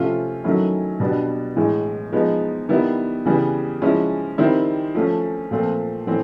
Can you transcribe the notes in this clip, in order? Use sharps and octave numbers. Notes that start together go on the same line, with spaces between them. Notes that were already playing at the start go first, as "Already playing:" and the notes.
Already playing: C3 F3 A3 C#4 F4
D#3 F#3 A3 C#4 E4
B2 G3 B3 D4
A2 E3 G#3
F3 G#3 B3 D#4
D#3 G3 B3 E4
C#3 E3 G3 B3
F3 G#3 C#4 E4
D#3 G3 C4 E4
F3 A3 C#4
A#2 F3 A3 C4
A2 E3 A3 C4